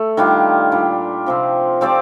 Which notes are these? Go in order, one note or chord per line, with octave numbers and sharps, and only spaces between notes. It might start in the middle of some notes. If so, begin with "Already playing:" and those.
Already playing: A3 A4
D#3 G3 D4 F4
A#2 G3 D4
C3 F3 C4
F3 C4 G4 D5